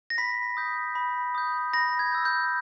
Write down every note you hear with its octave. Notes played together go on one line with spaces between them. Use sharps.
A#6
B5 B6
D#6 G6
B5
D#6 G6
B5 A#6
G#6
E6 G6
G6